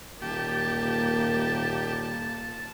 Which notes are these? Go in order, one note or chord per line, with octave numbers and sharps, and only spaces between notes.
D#1 A#3 G4 A5